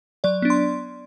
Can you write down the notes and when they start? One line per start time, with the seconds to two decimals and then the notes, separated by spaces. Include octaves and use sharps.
0.24 F#3 D5
0.42 B3 D4
0.50 C6